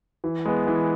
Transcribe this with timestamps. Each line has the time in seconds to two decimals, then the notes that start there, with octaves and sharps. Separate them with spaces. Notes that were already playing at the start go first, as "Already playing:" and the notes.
0.24 E3
0.45 G#3 B3
0.67 E3